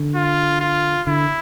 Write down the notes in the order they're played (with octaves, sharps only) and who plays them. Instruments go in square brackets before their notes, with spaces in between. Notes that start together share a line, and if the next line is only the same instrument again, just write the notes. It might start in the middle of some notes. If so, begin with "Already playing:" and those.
Already playing: [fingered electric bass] D3
[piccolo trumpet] F4
F4
[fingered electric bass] D3 [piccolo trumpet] E4